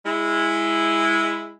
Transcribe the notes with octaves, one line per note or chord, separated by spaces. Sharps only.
G#3 E4